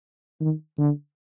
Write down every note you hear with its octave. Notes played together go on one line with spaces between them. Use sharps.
D#3
D3